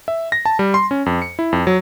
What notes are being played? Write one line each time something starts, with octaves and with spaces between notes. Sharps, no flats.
E5
A#6
A5
G3
C6
C#4
F2
C#7
E4
F2
F#3